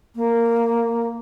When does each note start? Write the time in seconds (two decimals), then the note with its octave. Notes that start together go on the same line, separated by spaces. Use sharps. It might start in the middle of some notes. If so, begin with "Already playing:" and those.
0.16 A#3